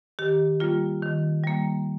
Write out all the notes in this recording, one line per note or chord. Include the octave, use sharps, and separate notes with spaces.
D#3 G4
G3 A#3 F4
D#3
G3 A#3